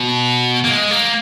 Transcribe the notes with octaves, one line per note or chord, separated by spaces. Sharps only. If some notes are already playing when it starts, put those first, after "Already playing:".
Already playing: B2
A#3
G#3
A#3